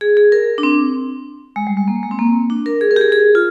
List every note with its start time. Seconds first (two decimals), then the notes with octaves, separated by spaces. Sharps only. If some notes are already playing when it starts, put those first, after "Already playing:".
0.01 G#4
0.17 G#4
0.32 A#4
0.58 D4
0.63 C4
1.56 G#3
1.67 G3
1.77 G#3
1.88 A#3
2.03 G#3
2.11 C4
2.19 A#3
2.50 D4
2.66 A#4
2.81 G#4
2.91 A#4
2.96 G4
3.01 G#4
3.12 G#4
3.35 F4